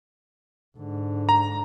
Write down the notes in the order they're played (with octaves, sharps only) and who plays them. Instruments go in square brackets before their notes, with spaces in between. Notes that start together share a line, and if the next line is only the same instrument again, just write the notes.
[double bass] G#2 D3
[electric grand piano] A#5